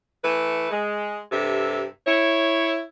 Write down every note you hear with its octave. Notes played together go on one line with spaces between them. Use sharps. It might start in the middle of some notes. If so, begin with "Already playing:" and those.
E3 A3 B4
G#3
G2 C3 A4 E5
E4 C#5